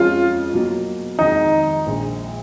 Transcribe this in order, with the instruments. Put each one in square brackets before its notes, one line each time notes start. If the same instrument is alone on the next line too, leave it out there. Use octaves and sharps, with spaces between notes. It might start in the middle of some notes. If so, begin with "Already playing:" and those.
Already playing: [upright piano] F2 F3 G#3 C#4 [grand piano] F4
[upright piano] B2 F#3 A#3
[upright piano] F2 D#3 G#3 [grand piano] D#4
[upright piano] A#1 A#2 G#3